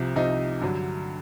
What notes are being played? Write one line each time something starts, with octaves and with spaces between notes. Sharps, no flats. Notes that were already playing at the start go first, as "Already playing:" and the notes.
Already playing: C2 C3 F3
C2 C3 F3 D#4
G2 D3 F#3